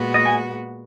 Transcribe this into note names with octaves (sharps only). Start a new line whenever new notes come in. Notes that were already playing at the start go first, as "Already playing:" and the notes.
Already playing: A#2 G#3 B3 F#4
D#5
G#5